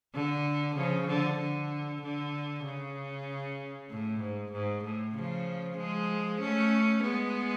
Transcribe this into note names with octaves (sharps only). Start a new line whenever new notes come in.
D3
C#3 F3
D3
D3
D3
C#3
A2
G#2
G#2
A2
C#3 F3
F3 G#3
A3 C#4
G#3 B3